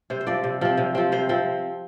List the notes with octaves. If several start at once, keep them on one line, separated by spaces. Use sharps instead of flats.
C3 C5
C5
F3 C4 D5
C3
F3 C4
C3
F3 C4
C3 C5
F3 C4